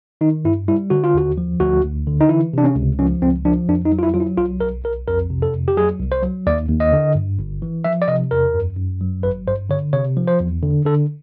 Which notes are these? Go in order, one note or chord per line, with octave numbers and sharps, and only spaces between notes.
D#3 D#4
G2 E4
G3 E4
D3 F#4
F4
D#2 F#4
F3
D2 F#4
D2
D3
D#4
E3 E4
C3 D4
C#4
C#2
F3 C#4
C#2 C4
F3 D4
F2 D4
D#4
F#3
F4
E4
F#3 F4
E4
B1 F4
B1 A#4
B1 A#4
F2 A#4
C3
A4
F2
G4
F#3 G#4
C2
C5
F#3
D#2 D5
D#2
D#5
D3
G2
G1
E3
F3 E5
D5
C3 D#5
E2 A#4
F#2
F#2
F#3
G#1 B4
G2 C5
D3 C#5
C3 C#5
F3
C5
E2
D3
D3 A4